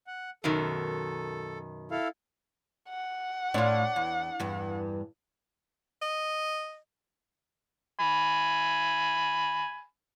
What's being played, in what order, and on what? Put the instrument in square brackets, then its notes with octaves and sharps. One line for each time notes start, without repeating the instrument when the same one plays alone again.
[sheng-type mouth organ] F#5
[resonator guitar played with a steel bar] F#2 B2 D#3 [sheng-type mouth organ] A4
[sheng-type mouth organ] E4 A4 F5
[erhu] F#5
[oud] A2 F4 [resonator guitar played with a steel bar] D4 C#5 D5
[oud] E2
E2 G2
[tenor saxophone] D#5
[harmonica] G#5 B5